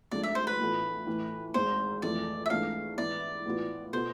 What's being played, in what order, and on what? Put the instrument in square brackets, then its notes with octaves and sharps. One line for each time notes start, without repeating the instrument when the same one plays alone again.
[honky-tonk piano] G#1 G#2 F3 A3 D4 [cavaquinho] D5
[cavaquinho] E5
C5
B4
[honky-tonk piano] A2 E3 B3 F4 A4
A2 E3 A3
[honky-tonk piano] G#1 G#2 G#3 [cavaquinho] C5
[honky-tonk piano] F2 E3 A3 [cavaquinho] D5
[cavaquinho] E5
[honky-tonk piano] G#2 E3 A3 D4 [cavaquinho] F5
[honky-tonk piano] G#2 E3 B3 E4 [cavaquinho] D5
[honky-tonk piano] A2 E3 B3 F4
[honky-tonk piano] B2 B3 F4 A4 [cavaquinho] C5